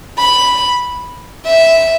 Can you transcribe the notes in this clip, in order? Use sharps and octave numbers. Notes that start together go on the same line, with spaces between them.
B5
E5